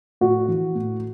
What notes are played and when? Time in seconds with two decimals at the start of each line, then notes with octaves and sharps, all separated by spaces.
0.21 A2 F#4
0.48 E3
0.75 A2